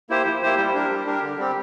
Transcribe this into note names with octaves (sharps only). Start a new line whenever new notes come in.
A#3 E4 G4 C5
F3
A#3 E4 G4 C5
G3
D4 G4 A#4
G3
D4 G4 A#4
D3
G3 C4 G4